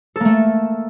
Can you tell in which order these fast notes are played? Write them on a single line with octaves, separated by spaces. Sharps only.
A4 A#3 A3